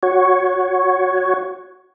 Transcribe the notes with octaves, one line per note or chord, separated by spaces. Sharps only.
F#4 C#5